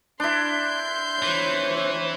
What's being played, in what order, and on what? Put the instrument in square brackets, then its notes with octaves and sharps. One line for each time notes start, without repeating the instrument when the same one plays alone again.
[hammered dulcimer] D4 E4 [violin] C6 G6
[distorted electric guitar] E3 [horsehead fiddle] C5 C#5